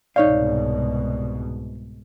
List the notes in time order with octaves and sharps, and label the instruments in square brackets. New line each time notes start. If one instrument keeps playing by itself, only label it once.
[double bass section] C2 G#2 B2 [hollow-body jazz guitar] D#4 C#5 F5 [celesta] D5